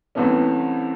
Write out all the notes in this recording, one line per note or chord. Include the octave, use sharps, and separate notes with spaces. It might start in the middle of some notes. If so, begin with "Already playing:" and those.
C2 C3 E3 A3 B3 C#4